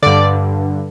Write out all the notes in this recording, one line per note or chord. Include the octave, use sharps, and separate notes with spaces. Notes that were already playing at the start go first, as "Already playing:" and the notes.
G2 D3 D5